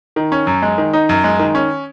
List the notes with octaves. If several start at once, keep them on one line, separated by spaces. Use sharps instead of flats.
D#3
C#4
F#2
G#3
D#3
D#4
F#2
G#3
D#3
C#4